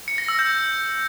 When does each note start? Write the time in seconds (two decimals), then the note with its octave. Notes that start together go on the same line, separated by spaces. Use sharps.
0.08 C#7
0.18 A#6
0.28 E6
0.39 G6